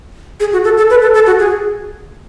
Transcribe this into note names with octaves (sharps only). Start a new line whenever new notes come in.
G#4
F#4
A4
A4
B4
A4
A4
F#4
G#4